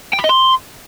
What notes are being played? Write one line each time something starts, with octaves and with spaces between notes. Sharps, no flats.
G5
B5
D#5
C6